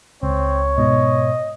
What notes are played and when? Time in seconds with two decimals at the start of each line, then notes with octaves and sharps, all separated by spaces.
0.23 C#2 C4 C#5
0.78 G#2 B2 D#5